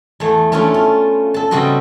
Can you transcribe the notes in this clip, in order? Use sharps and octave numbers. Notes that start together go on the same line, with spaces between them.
E2 A3
A3 C#4 D4 E4 F4
F4
A4 A5
C#3 G3 B3 C4 F#4 D#5